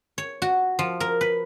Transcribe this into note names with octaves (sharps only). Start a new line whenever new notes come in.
C#5
F#4
F3
A#4
B4